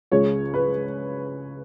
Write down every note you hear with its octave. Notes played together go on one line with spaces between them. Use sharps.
C#2 C#3 G#3 C#5
B4